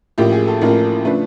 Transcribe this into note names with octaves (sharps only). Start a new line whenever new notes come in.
A1 A2 F3 A#3 G4
G#4
A4
A1 A2 F3 A#3 A#4
C#3 F3 A3 D4 B4